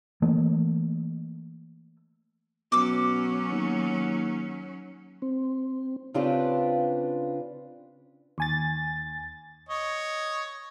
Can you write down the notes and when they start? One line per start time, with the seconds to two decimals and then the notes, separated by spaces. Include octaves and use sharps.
0.22 E3 A3 A#3
2.72 B2 F#3 C#4 D6 E6
3.51 D#2
5.22 C4
6.14 C#3 C4 D4 F4 G4 B4
8.38 D#2 G#5 A6
9.69 C#5 D#5